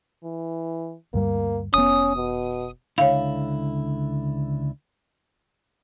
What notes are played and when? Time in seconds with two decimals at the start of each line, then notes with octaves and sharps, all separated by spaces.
0.24 E3
1.14 D2 G2 G3 A#3
1.74 F1 B3 C#4 D#6
2.16 B2
2.98 C#2 D3 E4 C#5 F5